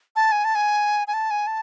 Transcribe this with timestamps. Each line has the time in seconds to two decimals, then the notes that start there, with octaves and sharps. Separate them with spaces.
0.16 A5
0.32 G#5
0.45 A5
0.55 G#5
1.08 G#5
1.14 A5
1.31 G#5
1.47 A5